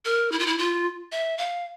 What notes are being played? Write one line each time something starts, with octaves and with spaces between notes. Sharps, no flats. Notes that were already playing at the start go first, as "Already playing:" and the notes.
A#4
E4
F4
E4
F4
E5
F5